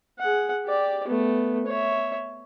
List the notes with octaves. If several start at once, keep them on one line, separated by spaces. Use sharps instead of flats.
G#4 F#5
G4 D5
A3 B3
C#5 E5